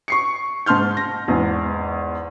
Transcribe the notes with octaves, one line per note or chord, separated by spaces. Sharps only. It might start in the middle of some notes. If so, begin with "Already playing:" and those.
C#6 C7 C#7
G#2 A5 C6 F6 G6
A#6
E2 G#2